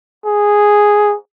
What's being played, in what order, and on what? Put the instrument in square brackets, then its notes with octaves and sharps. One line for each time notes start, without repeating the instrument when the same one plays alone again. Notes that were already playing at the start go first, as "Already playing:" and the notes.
[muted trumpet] G#4